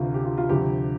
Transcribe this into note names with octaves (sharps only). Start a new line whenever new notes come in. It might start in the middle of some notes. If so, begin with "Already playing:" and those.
Already playing: D2 C3 E3 F4
G4
F4
F4
D2 C3 F3 G4